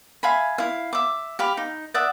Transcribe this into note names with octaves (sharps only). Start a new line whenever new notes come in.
E5 F5 G#5 B5
E4 F5
E5 D6
G4 F5 B5
D#4
D5 E5 F#5 D#6